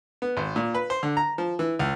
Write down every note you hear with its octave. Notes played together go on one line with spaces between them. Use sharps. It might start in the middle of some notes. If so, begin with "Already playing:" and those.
B3
G#1
A#2
B4
C5
D3
A#5
F3
E3
C#2